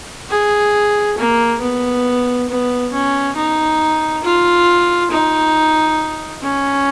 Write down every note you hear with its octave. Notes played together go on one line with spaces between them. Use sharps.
G#4
A#3
B3
B3
C#4
D#4
F4
D#4
C#4